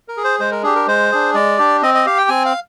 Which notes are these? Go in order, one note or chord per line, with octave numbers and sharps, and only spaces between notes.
A#4
G#4
C5
G#3 C5
A#4
D4 G4 G#4
A#4
G#3 C5
D4 G#4
G#3 D5
D4 G4
C4 D#5
D#5
G4 F5
G5
C4 G#5
F5